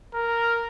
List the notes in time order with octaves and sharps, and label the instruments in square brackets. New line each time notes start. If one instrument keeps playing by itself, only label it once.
[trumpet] A#4